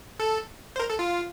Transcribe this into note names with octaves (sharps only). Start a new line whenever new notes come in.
A4
C5
A#4
A4
F4